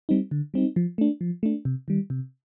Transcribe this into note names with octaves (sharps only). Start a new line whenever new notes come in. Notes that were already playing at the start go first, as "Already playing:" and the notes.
G3 C4 D#4
D3
G3 C4 D#4
F3
A3 D4
F3
A3 D4
C3
D#3 G3
C3